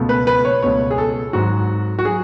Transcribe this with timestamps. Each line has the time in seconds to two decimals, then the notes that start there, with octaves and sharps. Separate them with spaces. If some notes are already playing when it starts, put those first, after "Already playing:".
Already playing: C#2 B2 A3
0.09 B4
0.27 B4
0.45 C#5
0.63 C#2 B2 A3 C#5
0.91 G#4
0.98 A4
1.33 G#1 G#2 F#3 F#4
1.99 F#4
2.05 F#3 G#4